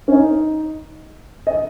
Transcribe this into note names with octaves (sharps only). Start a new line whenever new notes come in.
C#4
D#4
D#5